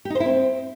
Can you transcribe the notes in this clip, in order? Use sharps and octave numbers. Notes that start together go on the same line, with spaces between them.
G4
D#4
C5
E4
C4